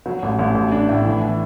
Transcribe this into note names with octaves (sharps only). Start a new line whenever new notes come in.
F#3
A1
A1
A1
D4
A2
E3
E3